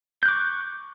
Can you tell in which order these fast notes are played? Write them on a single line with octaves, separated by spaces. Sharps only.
G6 F#6 D6 C#6